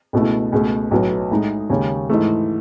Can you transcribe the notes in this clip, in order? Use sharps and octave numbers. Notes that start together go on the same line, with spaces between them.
C#2 B2 A3 E4
C#2 B2 A3
B1 A2 F#3 B3
A2 G#3 D#4
D#2 C#3 G#3 C#4
G#2 E3 A3